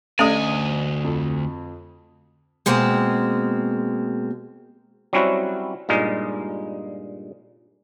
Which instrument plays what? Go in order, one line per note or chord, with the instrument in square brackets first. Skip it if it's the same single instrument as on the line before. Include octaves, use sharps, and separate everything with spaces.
[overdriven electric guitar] D2 G#5 [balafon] A3 C#4 A4 [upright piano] D5 D#5 D#6
[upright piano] F2
[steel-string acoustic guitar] B2 G#3 A#3 C4
[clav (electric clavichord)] F#3 G3 C4 C#4 E4 F#4
G2 A#2 G#3 D#4